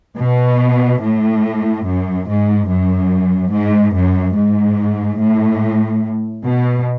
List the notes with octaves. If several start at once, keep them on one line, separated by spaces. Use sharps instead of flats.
B2
A2
F#2
G#2
F#2
G#2
F#2
G#2
A2
B2